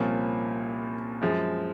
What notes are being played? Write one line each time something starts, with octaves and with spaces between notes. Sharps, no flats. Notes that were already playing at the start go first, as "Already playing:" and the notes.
Already playing: C2 A#2 F3 A#3 C#4
F#2 F3 G#3